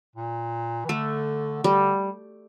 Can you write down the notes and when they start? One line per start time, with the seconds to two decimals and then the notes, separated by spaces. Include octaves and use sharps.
0.16 A#2
0.85 E3
0.89 D3 A3
1.64 D3 G3